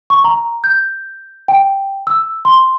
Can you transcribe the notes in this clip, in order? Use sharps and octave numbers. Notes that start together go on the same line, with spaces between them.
C#6
A#5
G6
G5
E6
C6